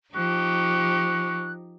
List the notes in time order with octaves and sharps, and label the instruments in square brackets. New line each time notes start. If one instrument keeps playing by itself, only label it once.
[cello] F3 [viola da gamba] D#4 G4 [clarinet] C#6 [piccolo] F#6